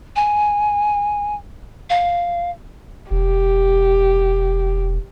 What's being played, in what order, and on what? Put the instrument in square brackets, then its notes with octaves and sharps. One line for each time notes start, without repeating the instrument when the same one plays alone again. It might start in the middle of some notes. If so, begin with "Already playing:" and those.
[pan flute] G#5
F5
[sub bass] E1 [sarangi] G4